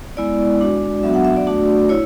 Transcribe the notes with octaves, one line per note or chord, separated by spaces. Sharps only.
G#3 B3 E4 D5
G#3 D4 F#4
F#3 B3 D4 F#4 E5
F#5
E5
D5
A3 D4 F#4
E4 C#5